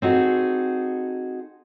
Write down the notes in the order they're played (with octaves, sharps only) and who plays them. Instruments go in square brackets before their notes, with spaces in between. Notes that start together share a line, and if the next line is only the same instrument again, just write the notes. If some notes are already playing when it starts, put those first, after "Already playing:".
[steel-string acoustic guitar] C4 D#4 F#4 G#4 A4